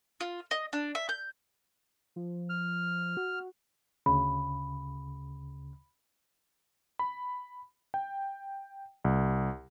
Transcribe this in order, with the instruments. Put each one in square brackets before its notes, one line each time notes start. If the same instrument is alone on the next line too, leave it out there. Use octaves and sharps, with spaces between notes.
[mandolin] F4
D#5
D4
E5
G6
[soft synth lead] F3
[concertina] F6
[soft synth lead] F#4
[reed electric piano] D2 C#3 [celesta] B5
[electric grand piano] B5
G5
C2